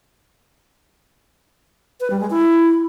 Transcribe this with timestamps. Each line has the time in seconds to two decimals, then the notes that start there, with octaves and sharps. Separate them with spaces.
2.00 B4
2.10 G3
2.20 G#3
2.30 E4